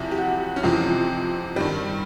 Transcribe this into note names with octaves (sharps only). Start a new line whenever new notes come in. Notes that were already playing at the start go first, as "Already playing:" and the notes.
Already playing: E2 C3 F3 E4
G4
F#4
C#4
F2 C3 E3 C4
G2 D#3 G3